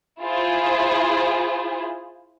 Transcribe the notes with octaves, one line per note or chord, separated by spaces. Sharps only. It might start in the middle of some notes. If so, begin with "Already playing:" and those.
E4 F4 G#4 C5